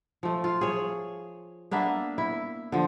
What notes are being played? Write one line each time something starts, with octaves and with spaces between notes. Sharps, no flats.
F3 A3
F4
G#4 C#5
A#3 B3 D4 E5
E4
D3 F3